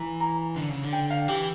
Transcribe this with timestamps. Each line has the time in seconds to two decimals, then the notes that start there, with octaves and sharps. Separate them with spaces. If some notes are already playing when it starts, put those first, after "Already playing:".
Already playing: E3 A#5
0.20 A#5
0.56 D3
0.69 C#3
0.83 D3
0.93 G5
1.10 F5
1.28 E3 G4